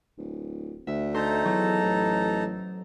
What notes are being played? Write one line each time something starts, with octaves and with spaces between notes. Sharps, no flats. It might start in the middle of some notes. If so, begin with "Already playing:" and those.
D1
D2 E5
D#4 A4 C5 A#5 G6
E2 F#3
A1